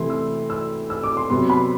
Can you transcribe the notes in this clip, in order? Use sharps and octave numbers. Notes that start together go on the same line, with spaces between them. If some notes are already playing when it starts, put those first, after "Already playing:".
Already playing: C3 E3 A3 E4 C6
E6
E6
E6
D6
C6
C3 F#3 B3 C6
B5